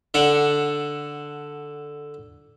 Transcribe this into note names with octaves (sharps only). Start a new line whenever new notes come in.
D3 D4 F#5